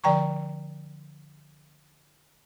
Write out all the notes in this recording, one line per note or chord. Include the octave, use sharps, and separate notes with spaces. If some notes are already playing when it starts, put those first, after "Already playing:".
D3 F3 D5 G5 A#5 C#6